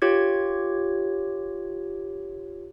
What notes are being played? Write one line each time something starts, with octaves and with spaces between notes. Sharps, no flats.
F4 G4 C#5 G#6